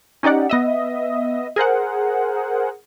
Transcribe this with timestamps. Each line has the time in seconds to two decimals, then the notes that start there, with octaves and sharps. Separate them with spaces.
0.23 C#4 D#4 G4 D5 F#5
0.49 B3 D#5 E5
1.56 G#4 A#4 C5 F#5